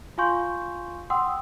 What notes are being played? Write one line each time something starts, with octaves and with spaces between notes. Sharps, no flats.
F4 F5 G#5 C6 C#6 G6
F#5 G5 C6 D#6 E6